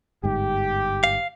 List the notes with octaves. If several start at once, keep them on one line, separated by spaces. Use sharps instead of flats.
G1 G#2 G4
F5